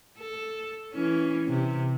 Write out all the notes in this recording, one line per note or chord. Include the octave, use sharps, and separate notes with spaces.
A4
E3 C#4
C3